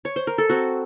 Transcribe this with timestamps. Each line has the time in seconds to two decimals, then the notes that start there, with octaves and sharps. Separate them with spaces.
0.05 C#5
0.16 C5
0.27 A#4
0.38 A4
0.49 C4 F#4